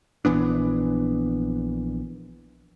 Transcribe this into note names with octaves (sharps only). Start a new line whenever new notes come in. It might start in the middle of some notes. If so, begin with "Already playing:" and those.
A#1 E3 B3 D4